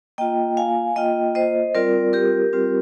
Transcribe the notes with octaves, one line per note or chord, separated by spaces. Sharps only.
A#3 F4 D#5 G5
F5 G#5
A#3 F4 D#5 G5
C5 D#5
G3 C4 F4 A#4 D5
G4 A#4
G3 C4 F4